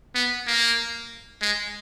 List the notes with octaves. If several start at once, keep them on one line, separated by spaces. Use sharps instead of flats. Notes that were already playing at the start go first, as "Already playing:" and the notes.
B3
A#3
G#3